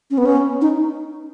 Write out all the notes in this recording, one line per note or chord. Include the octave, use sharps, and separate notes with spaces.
C#4
B3
C#4
D#4